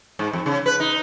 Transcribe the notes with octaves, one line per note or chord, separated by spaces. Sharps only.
G#2
F2
C#3
B4
D#4